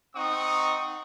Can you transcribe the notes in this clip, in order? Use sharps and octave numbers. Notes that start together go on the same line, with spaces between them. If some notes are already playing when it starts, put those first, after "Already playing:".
C4 D#4 F#5 C#6 D#6